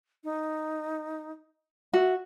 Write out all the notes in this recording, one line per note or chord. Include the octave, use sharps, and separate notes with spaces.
D#4
F#4 E5